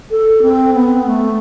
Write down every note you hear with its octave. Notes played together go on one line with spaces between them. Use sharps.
A4
C4
B3
A3